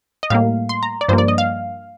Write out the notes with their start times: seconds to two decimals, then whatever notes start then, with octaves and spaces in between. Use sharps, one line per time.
0.23 D#5
0.30 A2 G3 A#3 F5
0.69 C6
0.83 A#5
1.01 D5
1.08 G2 F3 A#3 C5
1.18 D5
1.28 D#5
1.38 F5